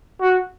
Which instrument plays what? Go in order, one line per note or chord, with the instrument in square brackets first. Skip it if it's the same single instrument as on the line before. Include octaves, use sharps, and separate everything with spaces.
[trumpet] F#4